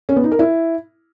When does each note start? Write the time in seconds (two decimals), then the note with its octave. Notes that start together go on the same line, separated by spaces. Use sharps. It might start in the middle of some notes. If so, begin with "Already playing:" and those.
0.09 C#4
0.16 B3
0.24 D#4
0.32 A#4
0.39 E4